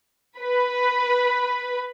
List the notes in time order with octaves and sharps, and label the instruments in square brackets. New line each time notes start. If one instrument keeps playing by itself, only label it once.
[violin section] B4 B5